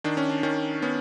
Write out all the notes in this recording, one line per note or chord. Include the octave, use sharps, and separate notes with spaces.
D#3 D4
C#4
D4
D#3 C#4
B3 C#4